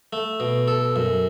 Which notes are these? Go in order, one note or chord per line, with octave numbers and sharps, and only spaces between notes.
A3
B2
A4
F#2